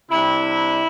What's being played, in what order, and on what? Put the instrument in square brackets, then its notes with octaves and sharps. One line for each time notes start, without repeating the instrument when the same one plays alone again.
[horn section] C3 G3 D4 E4